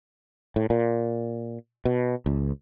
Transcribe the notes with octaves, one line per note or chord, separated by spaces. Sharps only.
A2
A#2
B2
C#2